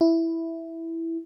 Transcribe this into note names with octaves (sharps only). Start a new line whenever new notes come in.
E4